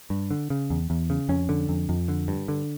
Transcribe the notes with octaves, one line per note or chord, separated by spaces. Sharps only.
G2
D3
C#3
E2
E2
C#3
F2 C#4
D3
F2
F2
D3
G2
D3